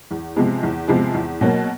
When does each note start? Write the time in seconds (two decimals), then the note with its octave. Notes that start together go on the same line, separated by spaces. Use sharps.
0.11 E2
0.36 C3 F3 G#3 B3
0.63 E2
0.88 C3 F3 G#3 B3
1.14 E2
1.41 B2 F#3 A#3